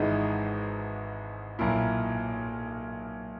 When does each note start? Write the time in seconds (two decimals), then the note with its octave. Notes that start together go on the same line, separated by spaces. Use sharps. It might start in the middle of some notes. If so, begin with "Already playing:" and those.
Already playing: G#1 G#2 E3 G#3 D#4
1.59 B1 A#2 A#3 E4